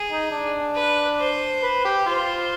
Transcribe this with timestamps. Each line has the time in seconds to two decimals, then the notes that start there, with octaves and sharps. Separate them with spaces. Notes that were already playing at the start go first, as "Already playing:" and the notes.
Already playing: G#4
0.10 D#4
0.32 D4
0.75 B4
1.19 C5
1.63 B4
1.85 G4
2.07 F4 C5